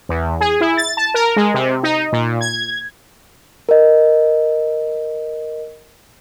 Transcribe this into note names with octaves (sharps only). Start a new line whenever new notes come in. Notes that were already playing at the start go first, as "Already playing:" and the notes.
E2
G#4
E4
A6
A5
A#4
G#3
C3
D#4
A#2
G#6
A#4 D#5